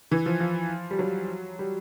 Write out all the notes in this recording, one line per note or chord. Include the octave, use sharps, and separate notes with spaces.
E3
F3
F3
G3
F#3
G3